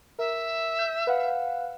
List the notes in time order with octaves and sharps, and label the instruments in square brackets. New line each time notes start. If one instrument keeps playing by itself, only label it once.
[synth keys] A#4 [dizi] E5
[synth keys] G6
B4 F5 F#5